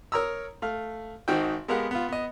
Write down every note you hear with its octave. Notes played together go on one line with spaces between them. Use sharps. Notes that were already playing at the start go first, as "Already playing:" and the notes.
A#4 C#5 A#5 D#6 E6
A3 F5 F6
G#1 D#3 D#4 F#4 C5 G5
G#3 B3 G4 A#4 F5 F#5
B3 F4
B3 D#5